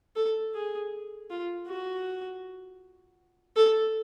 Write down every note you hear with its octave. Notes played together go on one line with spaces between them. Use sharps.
A4
G#4
F4
F#4
A4